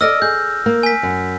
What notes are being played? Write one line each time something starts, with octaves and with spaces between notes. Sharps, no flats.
A4 D5 D#5 E6 F6 A#6
G#4 G6
A#3
G#5 B6
F#2